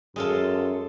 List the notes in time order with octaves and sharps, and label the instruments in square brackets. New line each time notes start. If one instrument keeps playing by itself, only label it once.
[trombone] F#2 [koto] G#3 F4 A4